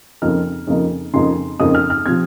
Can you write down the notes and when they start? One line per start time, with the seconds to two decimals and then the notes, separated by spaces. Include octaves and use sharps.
0.22 F2 C#3 F3 A#3 D#4 F6
0.67 F2 C#3 F3 A#3 D#4
1.14 F2 C#3 F3 A#3 D#4 C6
1.60 F2 C#3 F3 A#3 D#4 D#6
1.75 F6
1.90 F6
2.06 C3 F3 C4 G#6